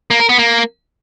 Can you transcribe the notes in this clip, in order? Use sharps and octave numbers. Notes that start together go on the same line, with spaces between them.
A#3
A#4
B3
A#3